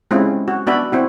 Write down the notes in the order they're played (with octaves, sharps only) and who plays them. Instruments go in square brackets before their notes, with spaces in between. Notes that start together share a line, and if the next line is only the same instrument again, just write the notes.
[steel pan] G#3 C4 C#4 E4 F4
F#4
B3 D4 F#4 D5 E5 B5
C4 E4 F#4